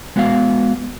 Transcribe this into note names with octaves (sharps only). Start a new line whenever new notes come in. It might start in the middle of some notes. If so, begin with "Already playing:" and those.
G#3 B3 F#4 C#5 F5